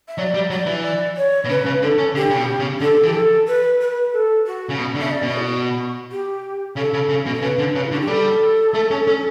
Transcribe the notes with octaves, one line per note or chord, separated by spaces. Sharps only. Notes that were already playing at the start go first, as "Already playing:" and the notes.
E5
F#3 D5
G3
F#3 D5
E3
D5
C#5
B2
C#3 B4
C#3
D3 A4
C#4
D3 G4
C#3
B2
C#3
D3 A4
E3
G4
A4
B4
B4
A4
F#4
C#3
B2
D3
C#3 E5
D5
B2
D5
E4
F#4
G4
C#3 A4
C#3
C#3
B2
A4
C#3 B4
D3
C#3
E4
D3 F#4
G4
G3 A4
A3
C#4
C#4